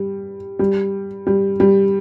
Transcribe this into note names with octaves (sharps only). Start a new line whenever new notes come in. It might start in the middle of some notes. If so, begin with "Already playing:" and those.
Already playing: G3
G3
G3
G3